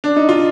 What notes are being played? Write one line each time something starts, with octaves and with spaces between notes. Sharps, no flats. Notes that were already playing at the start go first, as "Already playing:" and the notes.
D4
D#4
F4